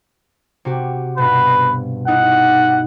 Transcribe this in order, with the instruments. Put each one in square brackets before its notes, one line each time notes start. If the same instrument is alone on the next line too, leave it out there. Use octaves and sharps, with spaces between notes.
[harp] C3 F#4 G4
[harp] G2 B2 [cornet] B4
[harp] D#4 E4 D#5 [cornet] F#5